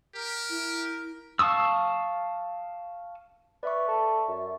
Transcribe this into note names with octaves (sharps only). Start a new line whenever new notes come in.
G4 A#4
E4
F5 A5 C#6 D#6 E6
B4 D5 E5 C#6
A4
F#2